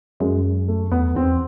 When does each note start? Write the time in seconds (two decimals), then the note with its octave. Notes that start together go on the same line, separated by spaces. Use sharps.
0.20 F#2 G#3
0.68 A3
0.91 E2 B3
1.16 E2 C4